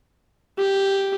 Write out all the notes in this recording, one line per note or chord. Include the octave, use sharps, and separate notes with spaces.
G4